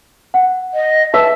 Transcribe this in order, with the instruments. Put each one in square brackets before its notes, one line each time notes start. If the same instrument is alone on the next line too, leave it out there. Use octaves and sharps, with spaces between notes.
[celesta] F#5
[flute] D#5
[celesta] B4 [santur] E5 [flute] A5